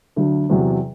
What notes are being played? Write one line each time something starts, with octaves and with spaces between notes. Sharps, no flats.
D2 D3 F#3
E2 C3 F#3